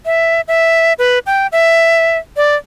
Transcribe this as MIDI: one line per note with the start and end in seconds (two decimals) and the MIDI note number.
0.06 0.41 76
0.48 0.93 76
0.99 1.19 71
1.26 1.47 79
1.52 2.18 76
2.37 2.55 74